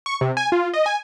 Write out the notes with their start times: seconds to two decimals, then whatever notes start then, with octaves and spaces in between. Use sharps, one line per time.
0.06 C#6
0.21 C3
0.37 G#5
0.52 F4
0.74 D#5
0.86 G#5